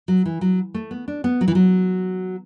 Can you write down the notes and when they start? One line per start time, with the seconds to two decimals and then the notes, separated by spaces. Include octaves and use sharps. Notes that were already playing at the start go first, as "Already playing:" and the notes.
0.08 F#3
0.26 E3
0.41 F#3
0.74 A3
0.91 B3
1.08 D4
1.24 B3
1.41 F#3
1.48 E3
1.55 F#3